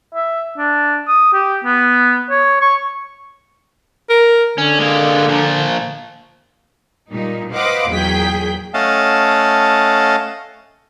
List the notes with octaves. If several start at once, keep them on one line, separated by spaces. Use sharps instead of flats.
E5
D4
D#6
G4
B3
C#5
C#6
A#4
D3 C#4
G#3 A#3
A#2 F3
A#2 G3 D#4
B4 C5 D#5 F5 F#5 D6
E2 A#2 F#3 G#4 G5 B6
A3 C#4 D#5 F5 F#5 A5